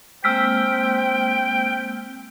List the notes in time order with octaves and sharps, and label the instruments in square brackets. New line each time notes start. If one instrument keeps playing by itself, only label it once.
[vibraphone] G#3 A#3 C4 [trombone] C5 [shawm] G5 [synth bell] E6 F6 B6